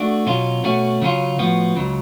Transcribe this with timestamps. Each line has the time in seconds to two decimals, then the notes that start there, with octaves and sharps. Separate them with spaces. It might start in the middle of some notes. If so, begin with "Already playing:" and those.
Already playing: A3 D4 F#4
0.27 B2 F#3 C#4 F4
0.63 B2 A3 C#4 F#4
1.02 C#3 F#3 C#4 F4
1.38 A2 F3 B3 F#4
1.76 C#2 C#3 F#3